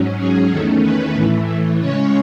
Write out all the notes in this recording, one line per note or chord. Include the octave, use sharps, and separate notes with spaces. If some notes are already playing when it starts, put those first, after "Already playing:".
Already playing: G#2 F#3 C#4
G#4
E2 D#3 A3 C#4 A4
B4
A2 E3 A3
C#3 G#3 C#4 C#5